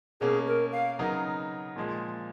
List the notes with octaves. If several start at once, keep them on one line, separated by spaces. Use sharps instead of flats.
B2 A#3 C#4 G#4
A#4
F5
C#3 F#3 B3 D#4 A#4
A#2 F3 G#3